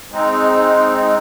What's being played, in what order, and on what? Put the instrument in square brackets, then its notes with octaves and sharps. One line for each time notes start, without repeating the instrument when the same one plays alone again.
[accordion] G#3 C4 D#4